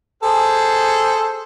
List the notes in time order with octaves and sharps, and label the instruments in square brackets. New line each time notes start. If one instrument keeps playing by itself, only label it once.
[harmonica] G#4 A4 C5